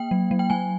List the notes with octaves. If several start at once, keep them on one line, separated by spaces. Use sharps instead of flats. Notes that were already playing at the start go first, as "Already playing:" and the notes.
Already playing: A#3 G5
F#3
F#3
G5
F#3 G#5